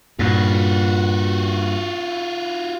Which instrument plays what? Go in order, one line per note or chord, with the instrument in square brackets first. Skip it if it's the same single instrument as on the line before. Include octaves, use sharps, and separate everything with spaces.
[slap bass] G2 A#2 [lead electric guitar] F4 F#4